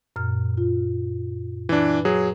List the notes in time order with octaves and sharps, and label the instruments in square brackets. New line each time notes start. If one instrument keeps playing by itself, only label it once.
[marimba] F#2 A#2 F6
F4
[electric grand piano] E3 D4 [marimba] B4
[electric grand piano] F#3 G#4